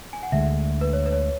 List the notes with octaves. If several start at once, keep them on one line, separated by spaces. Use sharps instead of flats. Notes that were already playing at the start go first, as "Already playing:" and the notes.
G#5
F#5
D2 D3 G#3 E5
B4
C#5
B4
C#5